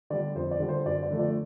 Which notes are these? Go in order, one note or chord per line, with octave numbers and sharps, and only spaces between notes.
D3 G3 D5
F2 C5
D5
D3 G3
C5
F#2 D5
D5
D3 F3 A3
D5